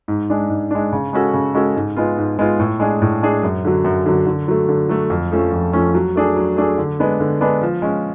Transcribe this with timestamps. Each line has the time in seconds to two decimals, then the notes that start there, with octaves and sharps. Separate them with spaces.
0.08 G#2
0.30 G#3 D4
0.50 G#2
0.71 G#3 D4
0.92 C#3
1.13 G#3 C#4 F#4 A4
1.34 C#3
1.54 G#3 C#4 F#4 A4
1.76 G#2
1.96 G#3 B3 F4
2.18 G#2
2.39 G#3 B3 F4
2.60 A2
2.80 G#3 D4 G#4
3.02 A2
3.23 G#3 D4 G#4
3.43 F#2
3.64 D3 F#3
3.84 F#2
4.06 D3 F#3
4.26 D3
4.48 F#3 A3
4.69 D3
4.89 F#3 A3
5.10 F2
5.32 F3 A3 C#4
5.53 F2
5.73 F3 A3 C#4
5.94 F#3
6.16 A3 D4 G#4
6.36 F#3
6.57 A3 D4 G#4
6.78 D3
7.00 G#3 B3 D4
7.20 D3
7.41 G#3 B3 D4
7.62 F3
7.82 G#3 C#4